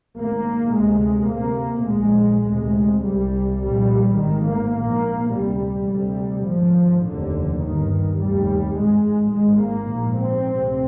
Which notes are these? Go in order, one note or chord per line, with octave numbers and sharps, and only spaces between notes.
G#1 G#2 A#3
D2 C3 G#3
D2 C3 A#3
A#1 A#2 G#3
D2 C3 G#3
C2 C3 G3
A#1 A#2 G3
G#1 G#2 D#3
A#3
A#1 G#2 A#3
D2 C3 G3
D2 C3 G3
G#1 G#2 F3
F1 D#2 D3
G1 G2 D#3
F1 D#2 G3
G#1 G#2 G#3
G#1 G#2 G#3
A#3
A#1 G#2
C4
D2 C3